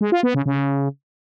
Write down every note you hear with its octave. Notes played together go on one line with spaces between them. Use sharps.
G#3
F4
B3
C#3
C#3